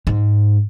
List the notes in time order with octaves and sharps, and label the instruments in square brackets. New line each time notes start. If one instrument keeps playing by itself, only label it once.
[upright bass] G#2